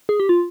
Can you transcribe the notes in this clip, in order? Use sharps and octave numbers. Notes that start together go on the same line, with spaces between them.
G#4
G4
F4